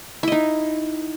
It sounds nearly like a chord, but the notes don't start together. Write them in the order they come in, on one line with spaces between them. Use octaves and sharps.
E4 D#5 D#4